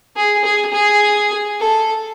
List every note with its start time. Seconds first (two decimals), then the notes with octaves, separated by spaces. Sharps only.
0.16 G#4
0.44 G#4
0.73 G#4
1.60 A4